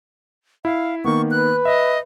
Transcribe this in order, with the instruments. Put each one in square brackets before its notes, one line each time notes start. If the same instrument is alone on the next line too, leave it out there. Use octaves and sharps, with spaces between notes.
[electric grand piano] E4 [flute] F5
[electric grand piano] D#3 A#3 B3 [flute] C#6
[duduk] B4 [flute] F#6
[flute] D#5 [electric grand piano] E5